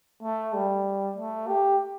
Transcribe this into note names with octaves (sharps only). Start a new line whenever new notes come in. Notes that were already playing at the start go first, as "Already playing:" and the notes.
A3
G3
A3
G4